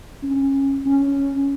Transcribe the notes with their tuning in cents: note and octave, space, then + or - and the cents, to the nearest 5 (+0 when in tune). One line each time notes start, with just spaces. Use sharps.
C#4 -20
C#4 +5